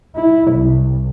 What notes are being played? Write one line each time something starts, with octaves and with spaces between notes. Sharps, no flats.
E4
C2